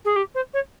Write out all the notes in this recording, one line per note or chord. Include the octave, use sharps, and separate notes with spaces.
G#4
G4
C5
C#5